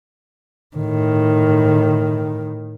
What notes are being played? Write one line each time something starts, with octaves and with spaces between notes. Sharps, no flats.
A2 D#3